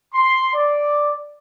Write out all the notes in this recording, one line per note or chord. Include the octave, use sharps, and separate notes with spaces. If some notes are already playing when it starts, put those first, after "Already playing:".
C6
D5